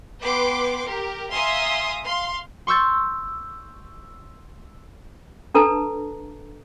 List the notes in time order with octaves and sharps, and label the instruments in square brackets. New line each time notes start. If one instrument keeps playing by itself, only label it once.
[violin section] B3 B4 G5 C6 D6
G4 A#4
E5 F5 G#5 A#5 C6 D#6
F5 C6
[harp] C6 C#6 E6 G6 A6
[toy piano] D4 A4 B4 A5 A#5